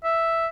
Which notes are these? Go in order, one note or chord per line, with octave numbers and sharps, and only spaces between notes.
E5